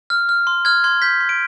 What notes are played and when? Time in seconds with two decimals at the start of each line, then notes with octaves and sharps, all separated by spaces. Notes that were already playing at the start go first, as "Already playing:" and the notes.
0.10 F6
0.29 F6
0.47 C6
0.65 F6 G#6
0.84 C6 G#6
1.02 G6 B6
1.21 C6
1.29 D7